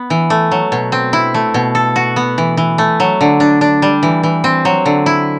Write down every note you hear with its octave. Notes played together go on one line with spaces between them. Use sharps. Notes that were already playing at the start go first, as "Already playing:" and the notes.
Already playing: B3
E3
A3
F#3
B2
C4
E4
A3
B2
A4
F#4
B3
E3
E3
A3
F#3
D3
D4
D4
G3
E3
E3
C4
F#3
D3
E4